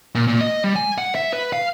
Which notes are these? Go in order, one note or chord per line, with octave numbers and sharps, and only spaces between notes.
A#2
A#2
D#5
G3
G#5
F#5
E5
B4
F5